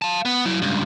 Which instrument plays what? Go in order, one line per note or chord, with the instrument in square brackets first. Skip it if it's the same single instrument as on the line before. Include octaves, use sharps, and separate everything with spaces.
[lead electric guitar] F5 A5
B3
F#3 E4
C#2 G2